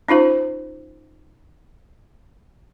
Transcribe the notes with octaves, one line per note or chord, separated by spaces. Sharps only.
C#4 D#4 F4 C5